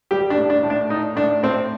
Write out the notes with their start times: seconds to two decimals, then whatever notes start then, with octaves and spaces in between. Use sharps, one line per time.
0.11 G3 G4
0.30 D4
0.38 A2
0.50 D4
0.63 A2
0.70 D4
0.89 A2 D#4
1.16 A2 D4
1.43 A2 C4